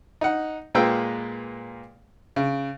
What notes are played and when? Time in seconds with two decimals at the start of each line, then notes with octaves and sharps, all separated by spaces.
0.21 D#4 F#5
0.75 A#2 G#3 A#3 B4 G5 E6
2.36 C#3